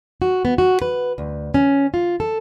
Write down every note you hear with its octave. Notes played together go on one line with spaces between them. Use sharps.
F#4
B3
F#4
B4
D2
C#4
F4
A4